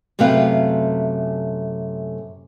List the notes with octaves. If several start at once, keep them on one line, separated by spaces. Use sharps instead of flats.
F#2 C3 A3 B4 F5